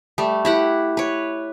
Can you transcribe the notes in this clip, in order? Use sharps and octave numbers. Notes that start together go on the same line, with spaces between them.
G3 A3
E4 G4 F#5
B4 C#5